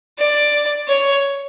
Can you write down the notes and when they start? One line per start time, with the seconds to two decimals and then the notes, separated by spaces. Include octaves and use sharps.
0.18 D5
0.88 C#5